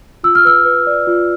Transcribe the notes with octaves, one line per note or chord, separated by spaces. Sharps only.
F4 E6
F6
B4 E6
B4
D5
F4